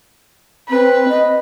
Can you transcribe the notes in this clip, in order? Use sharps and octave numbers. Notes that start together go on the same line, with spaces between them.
C4 B4
D#5